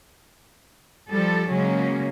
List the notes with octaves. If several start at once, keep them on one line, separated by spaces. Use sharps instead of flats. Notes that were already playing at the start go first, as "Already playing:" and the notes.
F3 G3 A4
C#3 F#3 G#3 A#3 C#4